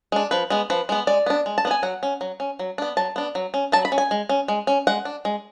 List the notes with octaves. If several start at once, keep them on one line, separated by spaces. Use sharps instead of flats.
G#3 D4
F3 B4
G#3 B3
F3 B4
G#3 B3
G#3 D5
B3 D4
G#3
A5
B3 D4
G#5
F#3 F#5
C#4
F#3
C#4
F#3
B3 D4
F#3 A5
B3 D4
F#3
C#4
F#3 A5
B5
C#4
G#5
G#3
C#4
G#3
C#4
G#3 F#5
D4
G#3